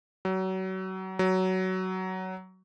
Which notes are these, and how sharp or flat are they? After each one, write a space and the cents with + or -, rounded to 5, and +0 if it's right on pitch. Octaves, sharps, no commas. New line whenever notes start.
F#3 +30
F#3 +15